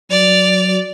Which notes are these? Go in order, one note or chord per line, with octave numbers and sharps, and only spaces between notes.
F#3 D5 F7